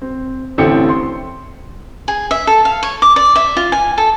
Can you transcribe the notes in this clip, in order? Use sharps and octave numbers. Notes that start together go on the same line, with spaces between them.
C4
A1 D3 C4 E4 G5 C#7
C6
G#4
E5
A4
F5
C#5
D6
D5
E5
F4
G#5
A4